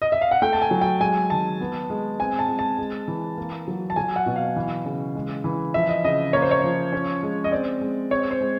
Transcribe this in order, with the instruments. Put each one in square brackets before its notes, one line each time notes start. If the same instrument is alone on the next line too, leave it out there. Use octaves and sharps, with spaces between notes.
[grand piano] D#5
E5
F5
F#5
A3 G5
A5
G#5
F#3
G5
G#3 G#5
D#3 A5
B3
G#3
C4 G#5
A5
G#3
A5
G#3
E3
A#3
F#3
A5
F#3 G#5
F#5
B2
F5
E3
C#3
G#3
E3
F3 E5
D#5
C#3 D#5
A#3 C#5
C5
C#5
F3
C#4
G#3
D#5
C4 D5
G#3
C4 C#5
C5
G#3